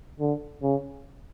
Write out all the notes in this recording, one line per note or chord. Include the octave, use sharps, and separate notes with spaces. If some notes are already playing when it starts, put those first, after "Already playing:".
D3
C#3